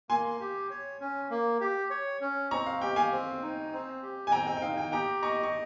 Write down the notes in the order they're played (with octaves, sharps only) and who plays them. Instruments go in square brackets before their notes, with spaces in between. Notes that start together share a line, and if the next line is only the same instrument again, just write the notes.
[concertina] A#3 [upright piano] G#5 C6
[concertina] G4
C#5
C#4
A#3
G4
C#5
C#4
[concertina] C4 [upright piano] A#5 C#6
[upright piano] F5
[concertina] G4 [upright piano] G5
[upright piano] F5 G#5
[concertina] C4
D#4
C4
G4
[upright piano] G#5
[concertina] C4 [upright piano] G5 A#5
[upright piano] G5
G5
[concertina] D#4 [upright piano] F5
[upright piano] G5
[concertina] G4 [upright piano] G5 A#5
[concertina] D#5 [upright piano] A#5 C#6
[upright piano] C#6